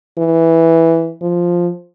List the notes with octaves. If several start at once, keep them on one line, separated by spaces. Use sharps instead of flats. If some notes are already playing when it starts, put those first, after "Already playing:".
E3
F3